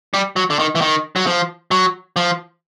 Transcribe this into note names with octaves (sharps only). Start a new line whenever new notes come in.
G3
F#3
D3
D#3
E3
D#3
F#3
F3
F#3
F3